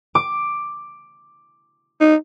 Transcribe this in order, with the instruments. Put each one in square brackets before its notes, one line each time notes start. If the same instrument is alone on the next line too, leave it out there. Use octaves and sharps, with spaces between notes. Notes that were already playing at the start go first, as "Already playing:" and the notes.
[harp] D6
[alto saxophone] D#4